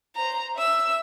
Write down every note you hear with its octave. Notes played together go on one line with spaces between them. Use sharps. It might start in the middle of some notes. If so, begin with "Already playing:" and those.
C5 A#5
E5 E6